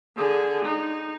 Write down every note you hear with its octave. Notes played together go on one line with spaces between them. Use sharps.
D3 G#4
D#4